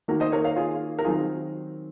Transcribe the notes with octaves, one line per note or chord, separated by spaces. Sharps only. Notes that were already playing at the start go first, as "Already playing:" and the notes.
D#3 A#3 D#4 F#4 A#4
C5 D#5
A#4 C#5
C#5 F5
F4 G#4
A#4
D#3 F#3 C4 D#4 F4 G#4